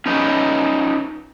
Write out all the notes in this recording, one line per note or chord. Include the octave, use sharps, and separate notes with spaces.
C#4 D#4 B4